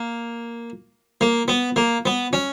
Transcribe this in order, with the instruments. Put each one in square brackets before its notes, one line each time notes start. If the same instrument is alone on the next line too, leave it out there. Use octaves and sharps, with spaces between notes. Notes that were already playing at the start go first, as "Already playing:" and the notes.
Already playing: [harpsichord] A#3
A#3
B3
A#3
B3
C#4